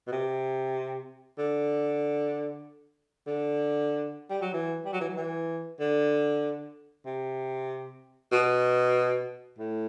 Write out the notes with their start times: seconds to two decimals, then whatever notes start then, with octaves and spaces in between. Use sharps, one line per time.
0.07 B2
0.12 C3
1.39 D3
3.27 D3
4.30 G3
4.42 F#3
4.53 E3
4.85 G3
4.93 F#3
5.01 E3
5.09 F#3
5.17 E3
5.80 D3
7.06 C3
8.32 B2
9.59 A2